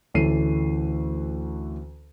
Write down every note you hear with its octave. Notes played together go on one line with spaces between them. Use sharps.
D2 E3 C#4 A4 C7 D#7